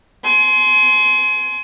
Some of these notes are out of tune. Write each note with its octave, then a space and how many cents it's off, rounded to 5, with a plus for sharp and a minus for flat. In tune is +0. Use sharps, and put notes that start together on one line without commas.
G#5 +30 C6 +0